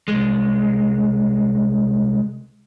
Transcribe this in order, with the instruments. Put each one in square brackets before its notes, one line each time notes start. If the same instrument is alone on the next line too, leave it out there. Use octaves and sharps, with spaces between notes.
[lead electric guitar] C2 G#3